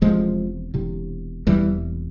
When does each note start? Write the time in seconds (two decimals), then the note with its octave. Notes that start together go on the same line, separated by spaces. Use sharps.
0.01 E1 E2 C3 F3 G#3
0.74 E1 E2 C3
1.47 E1 E2 C3 E3 G3